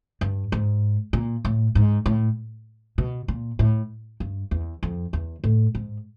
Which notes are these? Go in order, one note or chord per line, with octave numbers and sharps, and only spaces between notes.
G2
G#2
A#2
A2
G#2
A2
B2
A#2
A2
G2
E2
F2
E2
A2
G#2